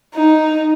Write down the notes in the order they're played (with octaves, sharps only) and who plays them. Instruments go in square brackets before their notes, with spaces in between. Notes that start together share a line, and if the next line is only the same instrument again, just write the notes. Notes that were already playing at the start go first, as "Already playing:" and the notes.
[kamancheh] D#4